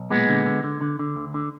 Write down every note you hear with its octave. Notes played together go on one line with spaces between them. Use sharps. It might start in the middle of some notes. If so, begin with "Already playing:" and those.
Already playing: B1
A#2 G#3 B3
D3
D3
D3
D3
D3
D2
D3